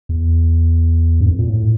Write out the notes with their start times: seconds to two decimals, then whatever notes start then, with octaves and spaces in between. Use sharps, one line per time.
0.09 E2
1.21 G2
1.26 F2
1.39 A#2
1.49 A2